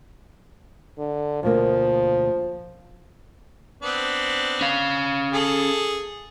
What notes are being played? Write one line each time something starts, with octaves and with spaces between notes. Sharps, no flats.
D3
D2 B2 F3 A#3
B3 C4 D4
C#4 F5
G#4 A4